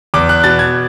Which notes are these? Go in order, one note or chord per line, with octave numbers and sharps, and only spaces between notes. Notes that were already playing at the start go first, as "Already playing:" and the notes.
E2 D6
F#6
B2 A6
G#6